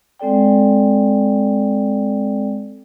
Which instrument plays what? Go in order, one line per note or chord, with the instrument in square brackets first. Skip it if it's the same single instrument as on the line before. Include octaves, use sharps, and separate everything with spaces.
[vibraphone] G#3 C4 A4 D5 G5